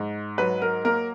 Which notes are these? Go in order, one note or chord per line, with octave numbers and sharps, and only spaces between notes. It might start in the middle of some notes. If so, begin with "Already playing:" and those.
Already playing: G#2
F#3 B4
A#4
A#3 A#4